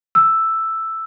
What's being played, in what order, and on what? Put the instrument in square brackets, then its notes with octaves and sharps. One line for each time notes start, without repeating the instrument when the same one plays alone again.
[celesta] E6